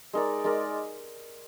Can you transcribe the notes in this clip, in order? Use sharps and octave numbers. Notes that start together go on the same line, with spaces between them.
G#3 D#4 A#4 D5
G#3 D#4 A#4 D5